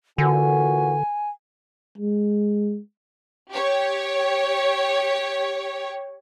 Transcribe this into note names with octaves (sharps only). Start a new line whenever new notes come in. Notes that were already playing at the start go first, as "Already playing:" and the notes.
A#2 D3 E3 F#4 G#5
G#3
G4 C#5